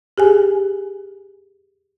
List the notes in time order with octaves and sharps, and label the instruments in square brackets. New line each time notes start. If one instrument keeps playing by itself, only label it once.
[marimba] G4 G#4 G#5